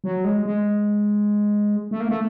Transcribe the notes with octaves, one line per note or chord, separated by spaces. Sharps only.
F#3
G#3
G#3
A3
A#3
A3